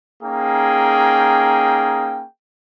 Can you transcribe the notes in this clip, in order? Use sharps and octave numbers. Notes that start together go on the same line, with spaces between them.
A#3 C#4 D#4 G#4 G5